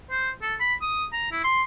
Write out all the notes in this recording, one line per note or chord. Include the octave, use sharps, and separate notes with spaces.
C5
A4
B5
D#6
A#5
E4
C6